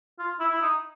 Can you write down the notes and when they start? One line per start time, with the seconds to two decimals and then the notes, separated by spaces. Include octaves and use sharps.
0.19 F4
0.40 E4
0.52 E4
0.62 D#4